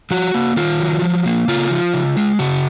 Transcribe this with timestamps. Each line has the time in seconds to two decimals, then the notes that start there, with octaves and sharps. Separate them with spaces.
0.11 F3 F#4
0.34 A#3
0.56 D#3 F4
0.79 F#3
1.02 F3
1.26 A#3
1.48 C#3 F4
1.70 F3
1.93 C#3
2.17 G#3
2.39 C#3 F#4